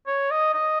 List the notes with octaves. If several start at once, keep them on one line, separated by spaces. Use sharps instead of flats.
C#5
D#5
D#5